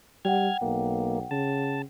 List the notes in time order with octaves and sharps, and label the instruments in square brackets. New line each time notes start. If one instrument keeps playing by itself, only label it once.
[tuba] G3 [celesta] F#5 G5 [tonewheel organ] F6 G#6
[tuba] B1 [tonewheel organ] A#3
[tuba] C#3 [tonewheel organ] A5